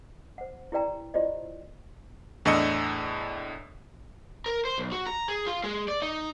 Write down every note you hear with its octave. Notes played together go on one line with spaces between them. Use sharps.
C5 F#5
E4 G4 B4 D5 G5 A#5
E4 F4 G4 C5 D5 D#5
E2 A2 D4 D#5 E6 C#7
A#4
C5
B1
F#4
A#5
G#4
F4
G#3
D5
D#4